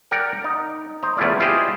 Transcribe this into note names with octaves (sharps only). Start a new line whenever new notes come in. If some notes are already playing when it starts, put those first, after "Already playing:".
A#4 D5 F#5 G5
D#4
C5 D#5 A#5
E2 A3 C#4 E4 F4 D5
E4 F4 G4 G#4 C5 D#5